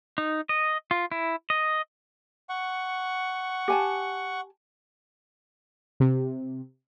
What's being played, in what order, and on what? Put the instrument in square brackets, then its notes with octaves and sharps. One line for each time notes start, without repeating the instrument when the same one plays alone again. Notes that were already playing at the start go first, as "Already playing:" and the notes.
[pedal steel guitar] D#4
D#5
F4
E4
D#5
[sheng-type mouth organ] F#5 C#6
[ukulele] G4 G#5 A5
[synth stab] C3